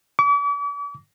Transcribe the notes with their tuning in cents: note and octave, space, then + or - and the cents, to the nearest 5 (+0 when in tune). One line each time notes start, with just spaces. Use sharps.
D6 -40